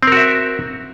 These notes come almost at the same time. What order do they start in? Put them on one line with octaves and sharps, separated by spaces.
C4 A#4 F#4 E5